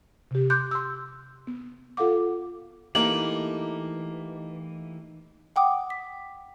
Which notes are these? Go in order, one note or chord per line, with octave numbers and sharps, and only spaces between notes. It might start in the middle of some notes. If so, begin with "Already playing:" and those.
C3 G4
C6 D6 F#6 G6
C6 E6
B3
F4 A4 F5 F#5 D6
E3 A3 A#3 D#4 G4 F#7
F#5 G5 D6 D#6
B6